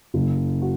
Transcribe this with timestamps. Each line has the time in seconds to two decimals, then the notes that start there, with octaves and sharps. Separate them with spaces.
0.14 F#1
0.62 F#4